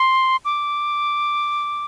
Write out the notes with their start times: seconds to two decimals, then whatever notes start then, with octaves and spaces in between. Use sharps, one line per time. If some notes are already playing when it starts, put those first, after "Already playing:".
Already playing: C6
0.45 D6